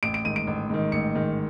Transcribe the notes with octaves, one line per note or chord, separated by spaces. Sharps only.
A1 D7
D7
G#2 D#3 D#7
D7
A1
G#2 D#3
A1 C#7
G#2 D#3